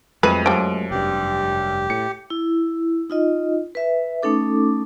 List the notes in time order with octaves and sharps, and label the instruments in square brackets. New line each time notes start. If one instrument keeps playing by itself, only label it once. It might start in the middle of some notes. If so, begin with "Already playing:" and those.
[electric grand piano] F2 D#7 [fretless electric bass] F#3 G#3 A3 [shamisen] B4
[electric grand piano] F#2 D7 [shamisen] F3 G3
[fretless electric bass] F1 G2 [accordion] G4
[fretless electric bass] A2 [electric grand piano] C#7
[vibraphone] E4
D#4 F4 D#5
B4 E5
A3 C#4 D#4 A4 D6